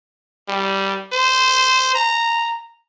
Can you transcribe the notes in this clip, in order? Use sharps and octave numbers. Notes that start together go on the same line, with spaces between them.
G3
C5
A#5